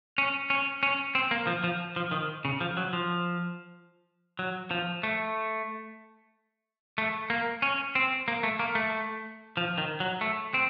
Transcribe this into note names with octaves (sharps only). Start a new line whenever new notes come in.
C#4
C#4
C#4
C4
A#3
F3
F3
F3
D#3
C#3
F3
F#3
F3
F#3
F3
A3
A3
A#3
C#4
C4
A#3
A3
A#3
A3
F3
D#3
F#3
A3
C4